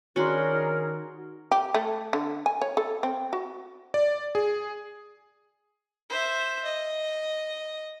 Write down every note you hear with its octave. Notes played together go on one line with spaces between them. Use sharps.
D#3 C#4 D4 F#4 G#4 A#4 B5 C6
G4
A3
D3
G#5
C#5
A4
C4
F#4
D5
G#4
C5 E5
D#5